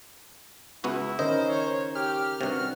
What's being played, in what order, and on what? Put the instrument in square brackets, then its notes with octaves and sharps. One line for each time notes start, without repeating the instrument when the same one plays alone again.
[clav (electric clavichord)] C#2 B3 F#4 [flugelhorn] E4
[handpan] D#3 C#4 A#4 [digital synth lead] C5 [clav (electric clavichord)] D#5
[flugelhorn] C#5
[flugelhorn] G4 [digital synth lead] F6
[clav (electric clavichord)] G2 C3 [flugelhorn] F#4